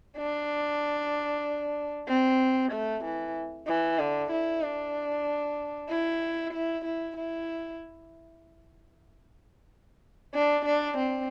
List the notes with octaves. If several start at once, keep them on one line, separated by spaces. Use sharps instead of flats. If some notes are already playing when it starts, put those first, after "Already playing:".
D4
C4
A3
E3
E3
D3
E4
D4
E4
E4
E4
E4
D4
D4
C4